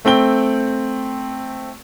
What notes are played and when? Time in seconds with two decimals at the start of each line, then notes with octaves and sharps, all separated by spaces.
0.05 A3 C4 G5 G7